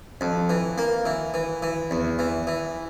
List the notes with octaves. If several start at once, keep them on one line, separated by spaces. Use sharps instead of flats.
F2
E3
A#3
E3
E3
E3
E2
E3
E3